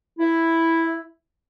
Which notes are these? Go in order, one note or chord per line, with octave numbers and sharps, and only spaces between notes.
E4